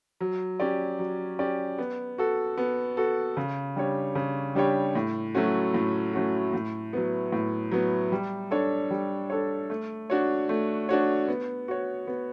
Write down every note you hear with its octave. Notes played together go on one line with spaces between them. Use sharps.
F#3
C#4 G4 D5
F#3
C#4 G4 D5
B3
F#4 A4
B3
F#4 A4
C#3
G3 D4 G4 C#5
C#3
G3 D4 G4 C#5
A2
F#3 A3 C#4 F#4
A2
F#3 A3 C#4 F#4
A2
F#3 B3
A2
F#3 B3
G3
D4 A4 C#5
G3
D4 A4 C#5
A3
D4 F#4 C#5
A3
D4 F#4 C#5
B3
F#4 C#5
B3